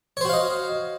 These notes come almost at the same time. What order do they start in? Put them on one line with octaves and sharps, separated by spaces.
C#5 C5 F#4 F5 D#5